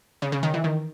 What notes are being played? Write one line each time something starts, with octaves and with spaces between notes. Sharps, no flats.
C#3
C#3
D#3
E3
D#3